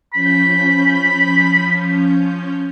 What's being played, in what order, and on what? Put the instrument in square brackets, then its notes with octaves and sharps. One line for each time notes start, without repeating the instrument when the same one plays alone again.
[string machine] F3 C#4 G6 [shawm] B5